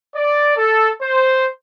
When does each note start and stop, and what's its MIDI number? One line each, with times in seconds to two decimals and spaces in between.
0.15 0.55 74
0.57 0.89 69
1.02 1.47 72